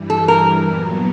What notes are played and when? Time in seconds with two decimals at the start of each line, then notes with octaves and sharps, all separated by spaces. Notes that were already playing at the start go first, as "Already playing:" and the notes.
Already playing: G2 E3 G3
0.10 A4
0.28 A#4
0.67 A#2 F#3 B3